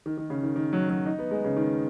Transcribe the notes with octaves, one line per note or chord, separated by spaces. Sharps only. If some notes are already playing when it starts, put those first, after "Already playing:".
D#3
D#3
C#3
D#3
D#3
F#3
F#3
D#4
B3
G#3
C#3
D#3